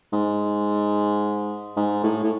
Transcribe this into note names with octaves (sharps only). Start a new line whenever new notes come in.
G#2
G#2
A2
A2